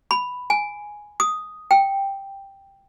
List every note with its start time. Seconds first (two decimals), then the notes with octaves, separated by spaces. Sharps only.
0.11 B5
0.50 G#5
1.20 D#6
1.71 G5